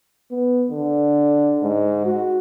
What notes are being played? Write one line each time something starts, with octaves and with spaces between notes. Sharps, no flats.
B3
D3
G#2
F#4